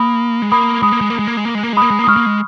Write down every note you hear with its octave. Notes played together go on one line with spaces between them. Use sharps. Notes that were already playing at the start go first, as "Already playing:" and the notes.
Already playing: A#3 B5 D#6
G#3
A#3 B5 D#6
G#3 B5 D#6
A#3
G#3
A#3
G#3
A#3
G#3
A#3
G#3
A#3
G#3
B5 D#6
A#3
G#3
A#3
D#6
G#3 C#6 F6
A#3
G#3